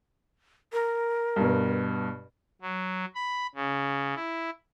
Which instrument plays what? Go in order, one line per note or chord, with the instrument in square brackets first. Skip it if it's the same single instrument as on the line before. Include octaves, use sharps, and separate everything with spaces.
[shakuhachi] A#4
[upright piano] G2 B2
[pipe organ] F#3
B5
C#3
E4